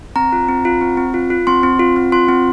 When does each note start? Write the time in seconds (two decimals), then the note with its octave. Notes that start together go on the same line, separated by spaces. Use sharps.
0.16 C4 A#5
0.32 F4
0.48 C4
0.65 F4
0.81 C4
0.97 C4
1.14 F4
1.30 F4
1.47 C4 C6
1.63 C4
1.80 F4
1.96 C4
2.12 F4 C6
2.29 C4